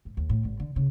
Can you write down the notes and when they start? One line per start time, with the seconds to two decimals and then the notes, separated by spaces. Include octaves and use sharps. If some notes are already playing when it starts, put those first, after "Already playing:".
0.05 G#2
0.17 D#2
0.29 A2
0.45 G#1
0.60 D3
0.76 C#3